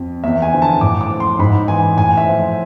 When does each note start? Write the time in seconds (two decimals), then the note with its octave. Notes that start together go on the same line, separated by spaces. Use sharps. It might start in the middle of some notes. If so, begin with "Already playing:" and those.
Already playing: F2
0.24 E2 E5
0.42 G#5
0.52 D3 F3
0.62 A5
0.81 A2 D6
1.01 D6
1.10 F3
1.20 C6
1.39 G#2 B5
1.68 E3 G#5
1.97 A2 G#5
2.17 E5
2.27 F3